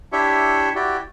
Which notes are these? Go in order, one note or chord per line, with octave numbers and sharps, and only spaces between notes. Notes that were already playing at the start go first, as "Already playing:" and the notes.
D4 E4 G4 C#5 E5
E4 F#4 G4 D5